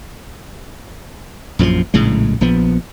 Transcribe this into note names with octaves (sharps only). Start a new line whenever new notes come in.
A#1 F#2 E3 F3
A#1 A2 C#3 G#3
A#1 F3 B3